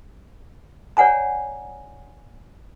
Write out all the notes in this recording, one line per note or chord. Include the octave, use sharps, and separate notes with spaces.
C#5 D5 F#5 G#5 A#5